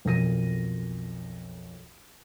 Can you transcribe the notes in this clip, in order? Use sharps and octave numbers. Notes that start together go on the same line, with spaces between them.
B1 F2 A#4 A#6 D#7